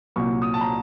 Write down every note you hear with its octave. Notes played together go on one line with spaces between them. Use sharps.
C2 A#2 F#3 A#3 C#6
D#6
A5
A#5